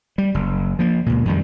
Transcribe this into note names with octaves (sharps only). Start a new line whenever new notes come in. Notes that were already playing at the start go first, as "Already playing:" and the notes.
G3
F#1
F3 A#3
C#2 A#2
F2 D#3 G3